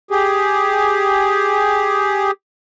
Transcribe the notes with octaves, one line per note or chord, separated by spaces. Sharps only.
G4 G#4